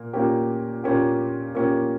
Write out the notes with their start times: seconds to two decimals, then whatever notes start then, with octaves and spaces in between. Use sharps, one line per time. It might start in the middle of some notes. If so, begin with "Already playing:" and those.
Already playing: A#2 A#3
0.13 A#2 A#3 C#4 G4
0.84 A#2 A#3 C#4 G4
1.54 A#2 A#3 C#4 G4